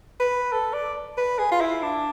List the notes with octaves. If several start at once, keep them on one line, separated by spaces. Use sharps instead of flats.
B4
A4
D5
B4
G#4
F4
E4
D4